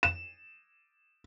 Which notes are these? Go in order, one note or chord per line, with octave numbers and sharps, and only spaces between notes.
E7